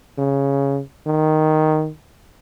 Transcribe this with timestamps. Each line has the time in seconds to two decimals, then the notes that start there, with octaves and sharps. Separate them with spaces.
0.18 C#3
1.06 D#3